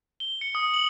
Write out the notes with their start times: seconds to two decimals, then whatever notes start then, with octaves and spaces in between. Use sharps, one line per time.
0.20 G7
0.41 C#7
0.55 D#6
0.74 F#7